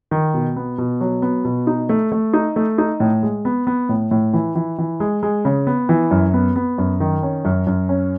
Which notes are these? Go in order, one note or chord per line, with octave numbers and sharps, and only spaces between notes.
D#3
B2
B3
B2
F#3
B3
B2
D#4
A3
A3
D#4
A3
D#4
A2
G#3
B3
B3
A2
A2
E3
E3
E3
G#3
G#3
C#3
B3
E3
F#2
B3
B3
F#2
D#3
C#4
F#2
F#2
C#4